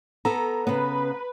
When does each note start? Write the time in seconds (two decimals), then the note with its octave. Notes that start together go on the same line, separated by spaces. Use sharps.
0.25 B3 A4 A#5
0.67 C#3 B3 B4